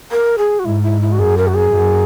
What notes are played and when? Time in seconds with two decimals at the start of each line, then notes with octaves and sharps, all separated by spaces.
0.11 A#4
0.38 G#4
0.59 F#4
0.65 G#2 E4
0.82 E4
1.01 E4
1.12 F#4
1.18 F#2 G#4
1.37 A#4
1.47 F#4
1.55 G#4
1.73 F#2